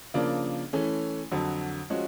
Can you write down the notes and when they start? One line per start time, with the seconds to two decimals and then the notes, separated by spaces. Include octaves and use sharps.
0.14 C#3 F3 A#3 D4
0.73 E3 A3 C#4
1.31 F2 D3 F#3
1.90 F3 G#3 C#4 F#4